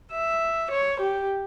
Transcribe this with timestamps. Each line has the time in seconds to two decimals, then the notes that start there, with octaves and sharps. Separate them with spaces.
0.13 E5
0.71 C#5
1.00 G4